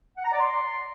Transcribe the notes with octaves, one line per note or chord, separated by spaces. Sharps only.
F#5
A#5
D5
C6